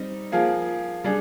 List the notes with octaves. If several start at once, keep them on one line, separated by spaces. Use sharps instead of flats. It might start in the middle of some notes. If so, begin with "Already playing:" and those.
Already playing: G3 C4 D#4
F3 A#3 F4 G#4
G3 D4 G#4